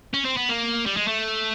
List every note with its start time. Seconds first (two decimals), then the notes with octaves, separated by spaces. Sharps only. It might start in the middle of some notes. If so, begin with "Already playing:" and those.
0.14 C#4
0.25 C4
0.37 B3
0.49 A#3
0.86 G3
0.97 G#3
1.08 A3